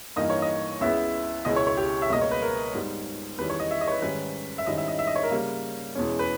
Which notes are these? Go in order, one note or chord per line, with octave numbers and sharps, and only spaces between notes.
G2 E3 A#3 D#4 D#5
C#5
D#5
C#2 C#3 G#3 B3 E4 E5
C#2 B2 G#3 C#4 E4 D#5
C#5
C#5
G4
E5
C#2 B2 G3 A#3 D#5
C#5
B4
A#4
G#2 G3 B3 D#4
E2 D#3 G3 C#4 E4 B4
C#5
D#5
E5
D#5
C#5
B4
G#2 D#3 G3 C#4 B4
E5
G#2 D#3 G3 C#4 E4 D#5
E5
D#5
E5
D#5
C#5
A#4
C#3 G3 A#3
E2 B2 G#3 C#4
B4